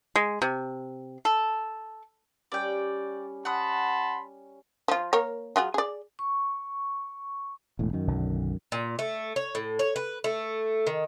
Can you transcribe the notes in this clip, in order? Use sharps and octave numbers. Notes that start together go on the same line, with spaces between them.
G#3
C3
A4
G3 C#4 D5 G5
F#5 A5 B5 C6 D#6
F3 F4
A#3 A#4 C#5
F#3 F4 G#4
G#4 D5
C#6
E1 A2
F#2 D#3
B1 D3
A#2
A3
C#5
A2
C#5
B4
A3
D#3